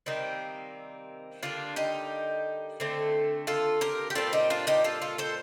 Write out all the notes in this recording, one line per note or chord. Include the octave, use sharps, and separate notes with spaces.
C3 D#3 G3 A#3 C4 D#4
D3 G3 A#3 D4 F4
D#4 G4
D3 A3 C4
F4 A4
G4 A#4
G4
A#2 G3 C4 F4 A4
D#4 G4
D4 F4
D#4 G4
F4 A4
F4 A4
A4 C5